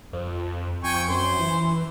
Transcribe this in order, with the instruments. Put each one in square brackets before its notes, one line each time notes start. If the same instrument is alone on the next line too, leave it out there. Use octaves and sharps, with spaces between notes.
[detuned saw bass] F2
[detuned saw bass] F2 [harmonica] G5 G#5 C#6
[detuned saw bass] F#2 [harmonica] C5
[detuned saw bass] E3